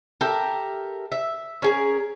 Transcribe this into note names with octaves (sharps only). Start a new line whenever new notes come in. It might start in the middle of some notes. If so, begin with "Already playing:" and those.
G4 A4 A#4 E5
E5
C#4 G#4 A#4